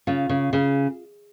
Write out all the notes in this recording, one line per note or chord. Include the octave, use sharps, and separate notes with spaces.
C#3 F4
C#3
C#3